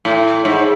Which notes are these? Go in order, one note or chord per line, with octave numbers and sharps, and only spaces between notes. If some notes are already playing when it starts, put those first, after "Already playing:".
A2
G#2